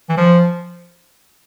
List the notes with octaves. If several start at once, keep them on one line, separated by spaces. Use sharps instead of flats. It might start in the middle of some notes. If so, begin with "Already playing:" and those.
E3
F3